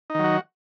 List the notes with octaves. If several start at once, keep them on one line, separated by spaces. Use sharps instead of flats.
D#3 F#3 D#4 F#4